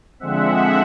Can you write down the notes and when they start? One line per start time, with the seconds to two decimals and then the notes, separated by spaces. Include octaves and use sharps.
0.19 D3 F3 G#3 C4 E5 F#5